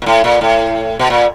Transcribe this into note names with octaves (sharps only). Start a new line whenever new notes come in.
A#2
A2
A#2
A2
B2
A#2